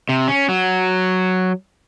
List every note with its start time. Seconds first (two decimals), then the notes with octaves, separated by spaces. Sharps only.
0.09 C3
0.28 C#4
0.49 F#3